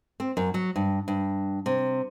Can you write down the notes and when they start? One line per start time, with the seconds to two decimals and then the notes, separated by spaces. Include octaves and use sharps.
0.20 C4
0.37 F#2
0.54 F#3
0.76 G2
1.08 G2
1.66 C3